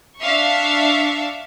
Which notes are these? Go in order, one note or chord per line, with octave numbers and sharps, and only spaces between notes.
D4 E5 F5 C#6